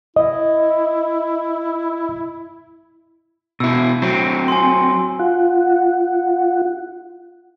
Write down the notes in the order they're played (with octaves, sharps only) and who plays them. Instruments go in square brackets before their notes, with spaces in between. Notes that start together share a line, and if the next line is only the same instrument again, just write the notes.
[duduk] E4 [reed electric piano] D#5
[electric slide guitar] B2 E4 [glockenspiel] E6
[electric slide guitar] F#3 C4
[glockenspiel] G#5 C6
[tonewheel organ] F4 F#5